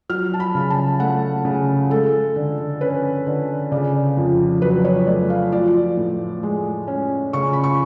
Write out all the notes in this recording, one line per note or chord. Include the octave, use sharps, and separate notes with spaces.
F#3 F6
A5
B5
C#3
A5
A3 F#5
C#3
G#3 A4
D3
C#4 B4
D3
C#3 D5
F2
F#3 B4
C#5
A3 D5
F5
F3 D5
A2
G#3
C#4
C#3 C#6
B5
C#6